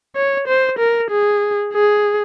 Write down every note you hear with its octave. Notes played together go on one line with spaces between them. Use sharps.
C#5
C5
A#4
G#4
G#4